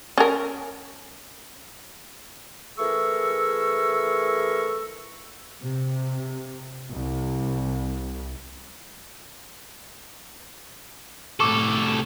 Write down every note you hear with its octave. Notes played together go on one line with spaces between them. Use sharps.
C#4 A#4
E3 A3 G#4 A#4 C#6 E6
C3
C2
C2 A2 A4 C#6 D6